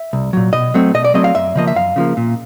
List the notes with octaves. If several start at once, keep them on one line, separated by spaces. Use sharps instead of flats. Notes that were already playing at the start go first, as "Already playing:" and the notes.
Already playing: E5
C2
A#2 F#3
B2 D#5
F#3 A3 C4
B2 D#5
D5
F#3 A3 C4 D#5
F5
F#2 E5
C#3 F3 A#3 D#5
E5
F#2 F5
C#3 F3 A#3
A#2